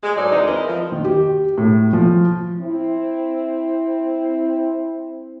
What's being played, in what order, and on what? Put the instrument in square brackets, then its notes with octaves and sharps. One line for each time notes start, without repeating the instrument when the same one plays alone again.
[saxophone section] G#3
G#2 F#3 D#4 A4 D5
D2 E3 G#3 C4 D#4
G#3 C4 E4 A#4 B4 D#5
F3
[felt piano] D#3
G4
A2
F3
[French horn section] C4 E4